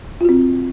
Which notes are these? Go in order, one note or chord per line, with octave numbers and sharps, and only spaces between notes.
C4 F4 F#4